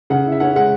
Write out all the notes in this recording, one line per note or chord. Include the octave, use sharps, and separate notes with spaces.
C#3 F#5
E4
E5
C#4 F#5
G#3 F#5